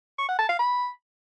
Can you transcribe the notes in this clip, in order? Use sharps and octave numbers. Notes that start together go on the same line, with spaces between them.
C#6
F#5
A5
F5
B5